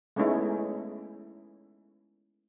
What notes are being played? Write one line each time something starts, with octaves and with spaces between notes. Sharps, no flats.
G#3 A3 B3 C#4 D#4 E4